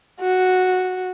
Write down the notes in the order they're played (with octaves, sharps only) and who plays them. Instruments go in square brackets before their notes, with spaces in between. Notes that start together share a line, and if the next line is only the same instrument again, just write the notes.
[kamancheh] F#4